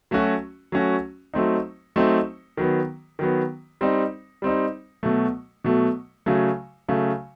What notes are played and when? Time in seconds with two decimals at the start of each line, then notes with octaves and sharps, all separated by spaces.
0.11 F#3 A3 C#4 F#4
0.72 F#3 A3 C#4 F#4
1.34 F#3 A3 C4 D#4
1.96 F#3 A3 C4 D#4
2.57 D#3 F#3 B3
3.19 D#3 F#3 B3
3.81 G3 C4 D#4
4.42 G3 C4 D#4
5.03 B2 F#3 A3
5.64 B2 F#3 A3
6.26 C#3 F#3 A3
6.88 C#3 F#3 A3